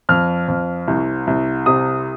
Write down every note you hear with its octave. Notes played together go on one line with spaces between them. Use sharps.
F2 F6
F2
C2
C2
C3 D#6